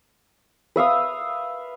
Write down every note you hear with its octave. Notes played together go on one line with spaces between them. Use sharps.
B4 E5 F5 D#6